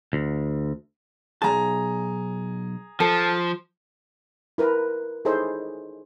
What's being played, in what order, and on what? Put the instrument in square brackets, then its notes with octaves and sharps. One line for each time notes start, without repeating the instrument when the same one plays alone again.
[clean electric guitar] D2
[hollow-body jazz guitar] B1 F3 A5 [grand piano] G#4 A#5
[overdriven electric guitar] F3 [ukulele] A4
[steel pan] E4 A#4 B4
D#4 E4 G#4 A4 C5 C#5